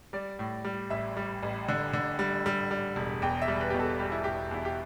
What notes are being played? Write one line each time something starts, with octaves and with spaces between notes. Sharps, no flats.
G3 D5
A2
G3
A1 E5
G3
A1
D3
D3
G3
G3
G3
E1
E2 G5
E5
G3
B4
B2 G4
A4
G3 G4
E4
E2 G4
E2 E4
G4